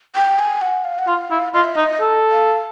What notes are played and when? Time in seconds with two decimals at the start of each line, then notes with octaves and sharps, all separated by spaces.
0.15 G5
0.39 G#5
0.61 F#5
0.84 F5
0.99 F#5
1.08 F4 F5
1.31 E4
1.54 F4 D#5
1.64 E5
1.75 D#4 D#5
2.01 A4
2.31 F5